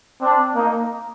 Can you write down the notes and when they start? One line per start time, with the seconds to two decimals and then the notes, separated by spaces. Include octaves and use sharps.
0.21 C4 D4
0.56 A#3 D#4